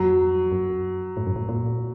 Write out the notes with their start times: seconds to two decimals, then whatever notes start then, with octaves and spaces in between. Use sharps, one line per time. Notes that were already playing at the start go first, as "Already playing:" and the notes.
Already playing: F2 F#3
0.52 F#2
1.17 A2
1.27 F#2
1.36 A2
1.49 A#2